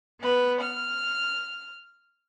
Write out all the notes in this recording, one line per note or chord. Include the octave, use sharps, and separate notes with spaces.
B3 B4
F6